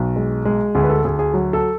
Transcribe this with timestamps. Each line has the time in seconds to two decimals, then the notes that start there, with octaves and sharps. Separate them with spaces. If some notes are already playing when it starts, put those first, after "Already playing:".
Already playing: B1 F#4
0.16 G#3
0.45 G#3
0.75 D2 G#4
0.83 B4
0.89 A4
1.04 D2 G#4
1.19 G#4
1.34 F#3
1.53 A4